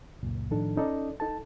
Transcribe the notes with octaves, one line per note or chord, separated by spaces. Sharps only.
C#2 F#2 A#2
A2 D#3 F3 D4 D#4 A4
C#4 D#4 A4 D5 D#5
D#4 A4 A5